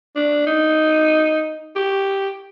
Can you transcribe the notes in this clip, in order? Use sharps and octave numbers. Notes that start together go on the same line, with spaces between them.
D4
D#4
G4